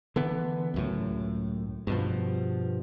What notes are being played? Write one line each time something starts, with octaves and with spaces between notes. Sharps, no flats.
D3 E3 B3
C#2 F#2 A2
G2 B2 F3